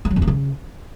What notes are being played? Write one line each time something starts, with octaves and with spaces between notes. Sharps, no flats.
A3
F#3
E2
A#3
C#3